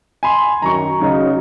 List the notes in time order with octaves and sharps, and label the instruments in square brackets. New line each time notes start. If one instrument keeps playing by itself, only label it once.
[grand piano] G#5 B5 C6
[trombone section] F#2 D#3 [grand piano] A#5 C#6
[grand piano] C#3 [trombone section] F#3 D#4